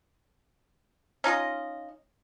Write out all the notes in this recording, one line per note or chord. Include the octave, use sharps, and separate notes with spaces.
C#4 D#4 F4 D#5